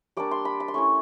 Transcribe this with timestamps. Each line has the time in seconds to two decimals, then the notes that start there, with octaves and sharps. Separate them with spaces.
0.17 G3 A#3 D4 D6
0.31 C6
0.45 B5
0.60 B5
0.68 C6
0.74 A3 C#4 E4 C#6